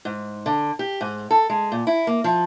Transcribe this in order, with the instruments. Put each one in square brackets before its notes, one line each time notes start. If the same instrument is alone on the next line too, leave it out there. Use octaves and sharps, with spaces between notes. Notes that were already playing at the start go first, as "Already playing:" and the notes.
[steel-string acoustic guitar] G#2
D3
G4
G#2
A4
G#3
A#2
E4
A#3
F3